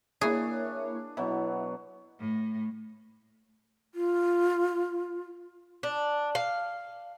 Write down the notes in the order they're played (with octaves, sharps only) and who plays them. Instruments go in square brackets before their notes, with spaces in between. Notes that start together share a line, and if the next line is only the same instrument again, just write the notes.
[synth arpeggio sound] A#3 E4 C#5 [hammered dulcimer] D4 [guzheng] G#4
[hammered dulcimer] B2 F#3 [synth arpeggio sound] E4
[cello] A2
[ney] F4
[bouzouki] D4
F5